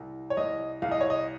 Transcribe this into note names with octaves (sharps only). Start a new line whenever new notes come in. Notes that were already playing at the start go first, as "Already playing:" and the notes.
Already playing: C2
C#5
C2 D#5
C2 F5
D#5
C#5
D#5